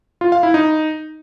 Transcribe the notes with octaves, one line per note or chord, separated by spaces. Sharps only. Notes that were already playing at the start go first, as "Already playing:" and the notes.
F4
F5
E4
D#4